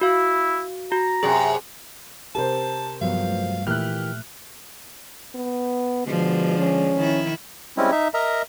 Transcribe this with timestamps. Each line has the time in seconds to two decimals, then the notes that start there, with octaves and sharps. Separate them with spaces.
0.01 E4 F#4 F5
0.92 F#4 A#5
1.23 F#2 C3 G#4
2.35 C3 G4 A4 A#4 C5 A5
3.02 G2 F3 F#3 B3 F5
3.29 A3
3.67 A#2 E3 A3 A#3 G4 E5 F6 F#6
5.35 B3
6.06 B2 D3 F3 G#3
6.59 C#4
6.97 D#3 E4
7.77 G3 G#3 C4 C#4 E4
7.92 D#4 E5
8.14 A#4 D#5 E5 A#5